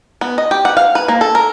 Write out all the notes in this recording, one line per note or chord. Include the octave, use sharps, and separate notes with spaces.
B3
D#5
G4
F#5
F5
B4
A#3
A4
A#4